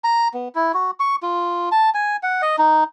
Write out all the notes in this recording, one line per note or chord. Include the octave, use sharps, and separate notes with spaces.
A#5
B3
E4
F#4
C#6
F4
A5
G#5
F#5
D#5
D#4